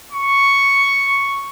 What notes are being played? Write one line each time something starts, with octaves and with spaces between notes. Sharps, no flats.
C#6